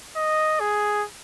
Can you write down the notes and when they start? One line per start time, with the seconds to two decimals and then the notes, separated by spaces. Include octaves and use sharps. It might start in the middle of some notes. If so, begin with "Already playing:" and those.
0.16 D#5
0.60 G#4